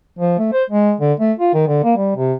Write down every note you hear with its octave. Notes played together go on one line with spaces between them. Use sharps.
F3
A3
C5
G#3
D3
A3
F4
D#3
D3
A#3
G3
C3